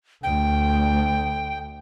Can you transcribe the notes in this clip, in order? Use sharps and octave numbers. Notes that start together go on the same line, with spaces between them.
D2 G5